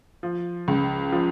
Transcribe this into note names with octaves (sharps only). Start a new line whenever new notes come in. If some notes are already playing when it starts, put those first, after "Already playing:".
F3
C#2
F3